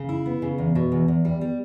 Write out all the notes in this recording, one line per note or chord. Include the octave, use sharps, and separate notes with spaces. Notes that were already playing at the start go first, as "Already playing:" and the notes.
Already playing: C#3
E4
B3
C#3
E2
B2
E2
E2
G3
G3